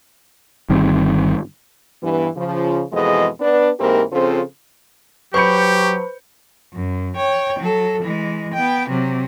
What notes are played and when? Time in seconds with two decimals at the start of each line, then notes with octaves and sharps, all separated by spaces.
0.69 G1 D#3 G3 C4
2.02 G2 E3 B3
2.36 C#3 F3
2.92 F2 B2 E3 G#3 G#4 D#5
3.40 B3 D4 B4
3.79 G#2 E3 A#3 C4 G4 A#4
4.11 C#3 F3 C4 F4 A4 C5
5.34 F#3 G4 B4 C5 B5 C#6 G6 C#7
6.73 F#2
7.16 C#5 G5
7.59 F#3 A4
8.02 E3 G#3
8.54 B3 G5
8.89 C3 F#3